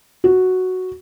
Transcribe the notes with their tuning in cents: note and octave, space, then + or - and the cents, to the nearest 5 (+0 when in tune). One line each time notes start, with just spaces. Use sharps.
F#4 +0